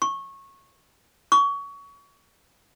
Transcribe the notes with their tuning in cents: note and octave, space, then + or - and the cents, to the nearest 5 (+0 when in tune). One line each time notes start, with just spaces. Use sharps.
C#6 -15
C#6 +25